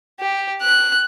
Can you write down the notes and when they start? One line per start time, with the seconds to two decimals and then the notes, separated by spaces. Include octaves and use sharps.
0.20 G4
0.61 F#6